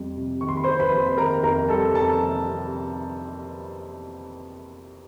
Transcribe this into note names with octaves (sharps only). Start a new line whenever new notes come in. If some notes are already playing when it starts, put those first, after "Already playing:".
Already playing: F2 G3
C3
D#3 C#6
C6
B5
C5 C6
F2
B4 B5
F2
B5
D#3 A#4 A#5
F2 A#4 A#5
G3 A4 A5
F2 A4 A5
C3
C3